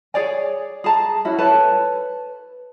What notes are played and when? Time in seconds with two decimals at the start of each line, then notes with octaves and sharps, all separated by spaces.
0.14 G#4 C#5 D5 G#5
0.84 G#4 A5 A#5
1.25 C#4 E4 F#4
1.39 A4 B4 C#5 A5